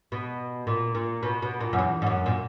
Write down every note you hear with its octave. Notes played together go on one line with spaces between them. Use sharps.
B2
A#2
A#2
B2
B2
A#2
F#2
E2
G#2
F#2
A#2